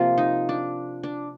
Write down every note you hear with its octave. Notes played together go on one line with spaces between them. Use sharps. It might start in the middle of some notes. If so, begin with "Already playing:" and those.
Already playing: C3 F3 A#3 F4
D#4
D4
D4